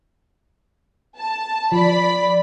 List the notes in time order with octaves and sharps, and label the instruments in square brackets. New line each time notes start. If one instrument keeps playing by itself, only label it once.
[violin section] A5
[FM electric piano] F3 [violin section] D5 B5